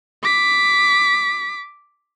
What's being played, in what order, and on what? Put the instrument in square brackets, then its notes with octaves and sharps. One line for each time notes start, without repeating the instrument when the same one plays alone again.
[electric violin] D6 B6